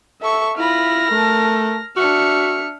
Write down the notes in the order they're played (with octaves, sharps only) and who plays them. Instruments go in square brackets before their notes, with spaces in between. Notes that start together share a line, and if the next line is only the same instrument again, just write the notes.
[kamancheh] A4 C#6 [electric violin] E5
[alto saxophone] E4 [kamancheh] F4 B5 [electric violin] F6 A#6
[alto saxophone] A3 [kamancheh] A#4 A5
[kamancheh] D4 E5 [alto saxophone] F#4 [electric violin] F6 C#7